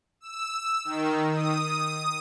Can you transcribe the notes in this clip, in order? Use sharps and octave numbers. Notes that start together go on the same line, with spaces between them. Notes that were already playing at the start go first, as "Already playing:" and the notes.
E6
D#3
D#6